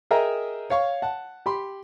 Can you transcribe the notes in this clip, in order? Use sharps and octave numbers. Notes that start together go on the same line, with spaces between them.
G#4 A#4 D#5 E5 G5 A#5
C#5 F5 C#6
F#5 A5
G4 B5 C6